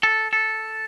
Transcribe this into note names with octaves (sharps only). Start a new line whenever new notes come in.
A4
A4